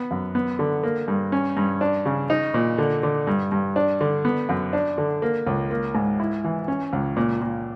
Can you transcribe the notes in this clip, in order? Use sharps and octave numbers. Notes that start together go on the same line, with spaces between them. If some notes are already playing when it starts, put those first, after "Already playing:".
Already playing: B3
F#2
B3
D3
A#3
G2
C#4
G2
D4
C#3
D#4
A#2
D3
D3
G2
G2
D4
D3
B3
F#2
D4
D3
A#3
C#2
A#3
G#2
E4
E3
C#4
C#2
A#2
A#2